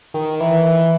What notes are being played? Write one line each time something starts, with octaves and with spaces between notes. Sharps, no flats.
D#3
E3
E3